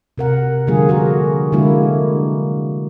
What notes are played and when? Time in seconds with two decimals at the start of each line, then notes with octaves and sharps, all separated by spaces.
0.18 C3 A#4 F#5
0.67 D3 F3 G3 A#3 F4 G#4
0.89 F#4 G#4 A#4
1.52 D3 F#3 G#3 A#3 E4 F#4